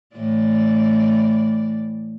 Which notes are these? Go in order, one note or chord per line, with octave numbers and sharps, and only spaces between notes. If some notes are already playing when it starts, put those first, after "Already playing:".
A2 E3 D5